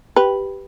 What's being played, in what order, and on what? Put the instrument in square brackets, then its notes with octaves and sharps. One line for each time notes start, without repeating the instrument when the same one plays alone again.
[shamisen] G4 B4